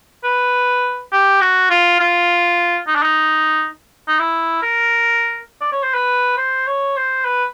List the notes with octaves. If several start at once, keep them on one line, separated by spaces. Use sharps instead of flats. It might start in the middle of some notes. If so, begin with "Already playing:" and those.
B4
G4
F#4
F4
F4
D#4
D4
D#4
D#4
E4
A#4
D5
C#5
C5
B4
C5
C#5
C5
B4